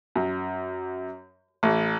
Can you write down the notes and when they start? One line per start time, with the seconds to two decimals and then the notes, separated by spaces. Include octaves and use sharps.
0.16 F#2
1.63 A1